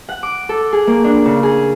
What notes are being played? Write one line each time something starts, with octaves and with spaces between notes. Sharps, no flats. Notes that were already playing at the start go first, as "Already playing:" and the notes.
F#5
D6
A4
G#4
A#3
D4
C#3
G#4